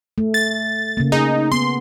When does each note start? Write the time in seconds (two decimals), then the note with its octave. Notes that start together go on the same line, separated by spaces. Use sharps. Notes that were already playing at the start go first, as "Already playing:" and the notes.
0.18 A3
0.34 A6
0.97 C#3 A#3
1.12 D#4 G#4
1.52 B3 C6